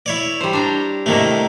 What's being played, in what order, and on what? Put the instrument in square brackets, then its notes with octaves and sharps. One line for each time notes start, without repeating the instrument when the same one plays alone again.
[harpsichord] E4 C#5 D5
[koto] G3 C5
D4 G5 A#5
[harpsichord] A2 D#3 A3 [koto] C3 A#3